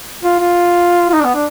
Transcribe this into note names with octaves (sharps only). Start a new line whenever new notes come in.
F4
F4
F4
D#4
D4
B3
D4